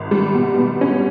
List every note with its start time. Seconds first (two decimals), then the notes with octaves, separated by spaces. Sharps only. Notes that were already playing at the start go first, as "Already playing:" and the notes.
Already playing: G#1
0.11 G3
0.34 B2
0.58 B2
0.81 C#4